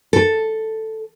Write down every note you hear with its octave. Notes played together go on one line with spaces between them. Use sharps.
A4